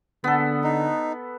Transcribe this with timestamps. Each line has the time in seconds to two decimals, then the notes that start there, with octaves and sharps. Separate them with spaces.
0.24 D3 B3 A4
0.64 D#4